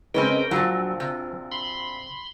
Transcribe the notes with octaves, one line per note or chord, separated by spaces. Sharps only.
C#3 G#3 C4 C#4 A#4 B4 G5
A#1 A#2 F3 F#3 F4 E6
C3
B5 C6